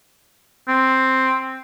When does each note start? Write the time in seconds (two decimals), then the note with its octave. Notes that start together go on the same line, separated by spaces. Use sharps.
0.68 C4